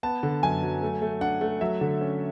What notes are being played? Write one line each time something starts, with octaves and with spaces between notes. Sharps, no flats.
B3 A5
D3
F#2 G#5
F#3
A3
A3
D4 F#5
A3
F#3 E5
D3
C#4